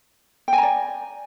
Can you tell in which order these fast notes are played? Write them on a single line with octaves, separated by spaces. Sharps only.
G5 G#5 A#5 D5